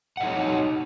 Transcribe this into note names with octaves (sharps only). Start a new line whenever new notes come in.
D#4 C#5 D#5 F#5